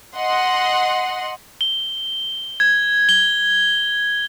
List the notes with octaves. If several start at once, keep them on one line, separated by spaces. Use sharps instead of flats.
D#5 F#5 C6
G7
G#6
G7